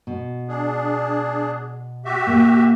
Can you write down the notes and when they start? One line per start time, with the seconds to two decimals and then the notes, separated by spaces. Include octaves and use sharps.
0.07 B2
0.48 D4 G#4
2.05 F#4 G4 E5
2.27 A#2 A#3